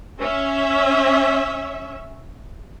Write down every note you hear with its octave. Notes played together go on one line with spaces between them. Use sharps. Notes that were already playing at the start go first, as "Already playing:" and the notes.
C#4 E5